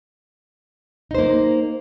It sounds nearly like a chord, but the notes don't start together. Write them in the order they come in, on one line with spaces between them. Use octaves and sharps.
D#4 C5 A#3